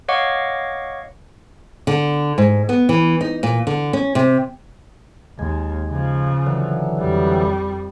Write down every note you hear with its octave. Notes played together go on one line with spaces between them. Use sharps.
C#5 D#5 F5 F#5 C#6 D6
D3
G#2
B3
E3
D#4
A#2
D3
C#4
C3
D#2 G#3
C#3 F3
D3 E3 F#3
F2 G3